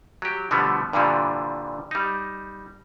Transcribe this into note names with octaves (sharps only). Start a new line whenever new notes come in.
F#3 G4
B2 D3 F3 G3 A3 B3
G2 A#2 D3 E3 F3 G3
G3 D#4